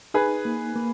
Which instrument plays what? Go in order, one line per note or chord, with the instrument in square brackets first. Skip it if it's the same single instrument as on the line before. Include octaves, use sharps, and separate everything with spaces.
[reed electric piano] D#4 [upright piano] G#4 B4
[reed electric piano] A#3
A#3